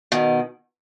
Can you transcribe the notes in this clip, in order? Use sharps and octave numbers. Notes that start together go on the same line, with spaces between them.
B2 D#3